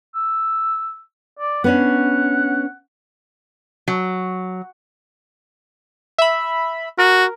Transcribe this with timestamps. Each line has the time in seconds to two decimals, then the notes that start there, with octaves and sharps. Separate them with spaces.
0.15 E6
1.39 D5
1.64 B3 C#4 D4 F#5
3.88 F#3
6.18 E5 B5
6.98 F#4 A#4